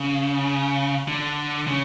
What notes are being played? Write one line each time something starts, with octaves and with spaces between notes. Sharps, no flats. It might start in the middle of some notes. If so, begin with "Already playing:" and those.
Already playing: C#3
D3
C#3